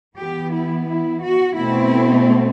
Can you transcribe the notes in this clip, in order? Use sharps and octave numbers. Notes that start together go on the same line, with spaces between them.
E3 B3 G4
E4
E4
F#4
B2 A3 C4 E4